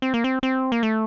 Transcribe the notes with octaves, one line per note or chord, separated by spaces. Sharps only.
C4
A#3
C4
C4
A#3
A3